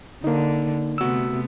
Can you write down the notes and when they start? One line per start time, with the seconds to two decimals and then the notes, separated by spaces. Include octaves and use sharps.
0.24 D3 A#3 D#4
0.98 C3 A3 B3 F#4 E6